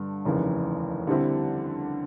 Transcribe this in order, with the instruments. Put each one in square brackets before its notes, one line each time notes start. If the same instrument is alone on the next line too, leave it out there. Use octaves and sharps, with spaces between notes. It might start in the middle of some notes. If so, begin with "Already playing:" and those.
Already playing: [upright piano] G2 D3
F1 D#2 C#3 E3
D3 G3 C4 E4